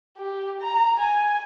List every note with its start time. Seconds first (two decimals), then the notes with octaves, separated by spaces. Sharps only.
0.17 G4
0.61 A#5
1.00 G#5